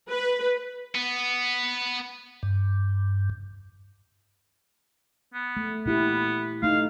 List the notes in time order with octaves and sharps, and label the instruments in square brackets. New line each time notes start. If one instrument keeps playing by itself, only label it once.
[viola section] B4
[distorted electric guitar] B3
[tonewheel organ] G2
[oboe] B3
[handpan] A3
[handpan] A#2 E4 G4 [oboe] B3
[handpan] A3 D#4 [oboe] F5